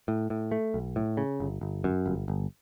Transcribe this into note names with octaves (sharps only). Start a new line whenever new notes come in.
A2
A2
A3
B1
A2
C#3
G1
G1
F#2
G1
G1